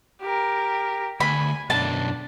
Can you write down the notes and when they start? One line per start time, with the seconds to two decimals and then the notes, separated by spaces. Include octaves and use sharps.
0.21 G4 A#4
1.20 D2 G#5 B5
1.70 B1 F#2 D4 A5